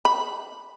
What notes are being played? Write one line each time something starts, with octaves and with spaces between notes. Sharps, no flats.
B5